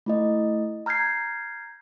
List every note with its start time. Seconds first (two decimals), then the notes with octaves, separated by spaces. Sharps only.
0.06 A3 E4 D#5
0.86 A#5 F6 G6 G#6 C7